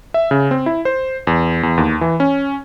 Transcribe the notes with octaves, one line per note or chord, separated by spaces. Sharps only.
E5
C#3
C4
E4
C5
E2
E2
D#2
E3
C#4